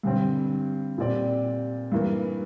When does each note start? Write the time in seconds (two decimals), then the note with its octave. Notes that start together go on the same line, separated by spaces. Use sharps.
0.03 G2 D3 G3 C4
0.98 A#2 G3 C4 G4 D5
1.92 G2 E3 A#3